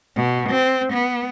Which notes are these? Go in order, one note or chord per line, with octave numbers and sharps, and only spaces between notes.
B2
C4
B3